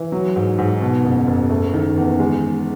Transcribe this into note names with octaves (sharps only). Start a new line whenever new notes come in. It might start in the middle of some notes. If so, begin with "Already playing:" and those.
Already playing: E3
F#3
G#2
G#2
B2
F#1
F#1
A3
D#3
E2
G#3